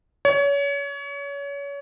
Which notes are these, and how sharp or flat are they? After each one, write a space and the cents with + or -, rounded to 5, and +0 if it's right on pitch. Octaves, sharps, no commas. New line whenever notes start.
C#5 +30